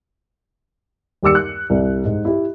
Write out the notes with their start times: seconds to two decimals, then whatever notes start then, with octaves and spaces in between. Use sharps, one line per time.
1.23 D#2 G3 D6 E6 C#7
1.35 F#6
1.70 C2
2.05 G#2
2.25 E4 G4